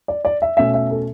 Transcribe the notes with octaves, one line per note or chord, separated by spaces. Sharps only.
D5
D5
E5
B2 A3 C#4 E5
E5
A4